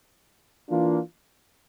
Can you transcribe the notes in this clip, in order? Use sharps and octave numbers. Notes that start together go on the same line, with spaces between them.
E3 A#3 D4 F4